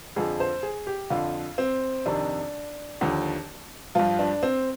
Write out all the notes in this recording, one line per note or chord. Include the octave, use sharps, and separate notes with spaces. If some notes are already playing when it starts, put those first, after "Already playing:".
F2 D3 F3 G#4
C5
G#4
G4
F2 D3 F3 F4
C4
F2 C3 D#3 D4
D#2 D3 F3
G2 F3 F4
D4
C4